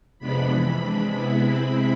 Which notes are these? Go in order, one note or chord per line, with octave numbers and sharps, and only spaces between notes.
F2 C3 G#3 B3 D4 B5
F2 C3 E3
C3 G#3 D4 B5
C3 G#3 B3 E4
C3 G#3 C4 E4